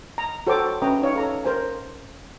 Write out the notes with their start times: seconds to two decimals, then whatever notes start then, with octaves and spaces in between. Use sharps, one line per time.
0.18 A#5
0.47 F#4 A4 C5 C#5 G5 D6
0.82 C#4 B4 E5 G5 A#5 D#6
1.02 D#4 C#5 F5
1.16 A4 A#5 D6
1.44 A#4 C5 G#5